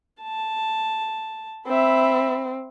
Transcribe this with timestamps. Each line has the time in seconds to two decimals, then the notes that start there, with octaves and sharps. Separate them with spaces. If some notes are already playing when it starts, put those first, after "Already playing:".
0.22 A5
1.67 C4 E5 B5